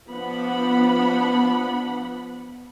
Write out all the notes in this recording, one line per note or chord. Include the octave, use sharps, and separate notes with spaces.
F3 B3 D4 F#5 B5